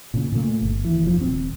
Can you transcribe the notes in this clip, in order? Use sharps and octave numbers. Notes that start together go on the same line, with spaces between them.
A#2 C#3
A#2 C#3 G#3 A3
G1
D#2 E3
F1 F3
D#1 C4